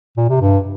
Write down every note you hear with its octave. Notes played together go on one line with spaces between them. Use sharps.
A#2
C3
G2